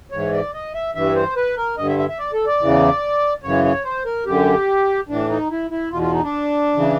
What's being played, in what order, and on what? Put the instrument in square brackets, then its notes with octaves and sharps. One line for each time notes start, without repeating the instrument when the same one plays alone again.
[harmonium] G#2 E3 C#5
D5
D#5
E5
G2 E3 E5
C5
B4
A#4
G2 D3 D#5
E5
E5
E5
D5
A4
D5
E2 C#3 E3
F#2 C#3 E3 C#5
C#5
C5
A#4
F#2 D3 G4
A2 E3 D4
D#4
E4
E4
E2 B2 F4
F4
D#4
D4
C#3 E3